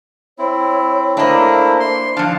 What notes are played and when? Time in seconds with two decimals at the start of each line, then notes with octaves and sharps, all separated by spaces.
0.38 C4 E4 C#5
1.17 A3 A#3 D4 E4 C5 D#5
1.80 C6
2.17 F3 D4 F5 A5